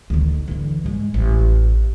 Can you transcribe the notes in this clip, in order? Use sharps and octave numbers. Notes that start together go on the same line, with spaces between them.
D2 D#3
D3 E3
G#2 G#3
A1